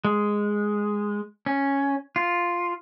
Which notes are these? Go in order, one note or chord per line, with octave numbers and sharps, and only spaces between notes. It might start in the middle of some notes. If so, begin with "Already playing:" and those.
G#3
C#4
F4